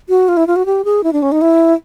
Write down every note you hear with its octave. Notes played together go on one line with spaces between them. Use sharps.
F#4
F4
E4
F4
F#4
G4
G#4
E4
D4
C#4
D#4
E4